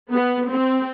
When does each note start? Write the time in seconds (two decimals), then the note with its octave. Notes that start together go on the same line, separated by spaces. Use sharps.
0.11 B3
0.50 C4